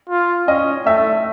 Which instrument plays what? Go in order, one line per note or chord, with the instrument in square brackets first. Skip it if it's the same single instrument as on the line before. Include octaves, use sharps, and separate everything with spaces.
[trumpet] F4
[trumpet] C#4 [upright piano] D#5
[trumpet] A3 [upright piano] E5